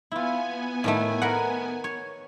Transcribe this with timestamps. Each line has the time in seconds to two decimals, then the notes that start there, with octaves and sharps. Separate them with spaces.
0.12 B3 E4 F4 G#5
0.84 A2 D#3 A3
1.22 A#4 B4 F#5
1.84 C#5